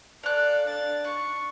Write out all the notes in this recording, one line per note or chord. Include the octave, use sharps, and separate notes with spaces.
A4 D5 F5 F#6
D4 A6
D4 C#6